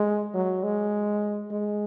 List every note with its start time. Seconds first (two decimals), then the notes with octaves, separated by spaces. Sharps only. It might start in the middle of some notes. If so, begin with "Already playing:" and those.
Already playing: G#3
0.34 F#3
0.63 G#3
1.51 G#3